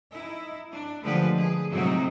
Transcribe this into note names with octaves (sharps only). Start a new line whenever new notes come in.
D#4 E4
D4
D3 F3 G#3 A3 G4 B4
G#4
A2 C3 F#3 G#3 C4 D#4